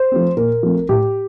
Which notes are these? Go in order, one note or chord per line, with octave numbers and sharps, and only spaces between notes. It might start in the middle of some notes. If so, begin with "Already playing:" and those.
Already playing: C5
F3 A3 C4
A#2 A#4
F3 A3 C4
A2 G4